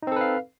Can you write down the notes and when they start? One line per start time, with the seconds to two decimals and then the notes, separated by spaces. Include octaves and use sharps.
0.03 D#4
0.07 C4
0.12 A4
0.16 B4
0.21 F5